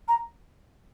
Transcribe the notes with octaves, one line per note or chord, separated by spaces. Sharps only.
A#5